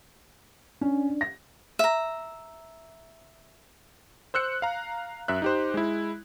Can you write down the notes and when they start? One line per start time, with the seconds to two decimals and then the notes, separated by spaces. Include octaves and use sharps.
0.81 C#4 D4
1.21 A#6
1.79 E5 A#5
4.34 C5 E6 F#6 C#7
4.62 F5 A#5
5.28 F#2 E5 F#6
5.42 D#4 G4 C5
5.74 G#3 E4